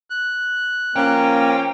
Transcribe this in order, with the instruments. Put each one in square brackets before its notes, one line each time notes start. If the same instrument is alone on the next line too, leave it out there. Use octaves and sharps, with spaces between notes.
[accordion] F#6
[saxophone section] F3 C#4 [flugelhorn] A#3 [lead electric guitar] G5